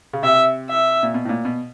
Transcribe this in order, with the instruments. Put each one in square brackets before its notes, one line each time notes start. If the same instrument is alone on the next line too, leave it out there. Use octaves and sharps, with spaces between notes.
[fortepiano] C#3
[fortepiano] C3 [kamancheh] E5
[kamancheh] E5
[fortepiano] A#2
B2
A2
A#2
B2